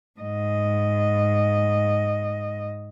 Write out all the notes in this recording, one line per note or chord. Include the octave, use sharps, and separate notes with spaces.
G#2 D#5